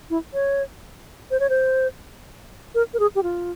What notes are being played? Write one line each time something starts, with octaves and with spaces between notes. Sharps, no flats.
E4
C#5
C5
C#5
C5
A#4
A#4
G#4
G4
F4